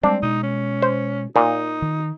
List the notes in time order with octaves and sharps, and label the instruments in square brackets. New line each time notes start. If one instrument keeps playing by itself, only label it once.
[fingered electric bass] G3 G#3 [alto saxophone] C4 [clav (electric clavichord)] D4
[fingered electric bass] B2 G#3 [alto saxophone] D#4
[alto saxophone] C#4
[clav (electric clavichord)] C5
[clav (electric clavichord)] A#2 [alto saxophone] D#4
[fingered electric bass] D#3